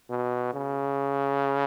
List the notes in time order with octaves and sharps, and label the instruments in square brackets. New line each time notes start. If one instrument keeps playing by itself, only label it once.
[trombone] B2
C#3